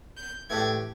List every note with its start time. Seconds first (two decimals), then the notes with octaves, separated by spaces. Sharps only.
0.17 G6
0.50 A2 E3 A3 D4 G4 G#6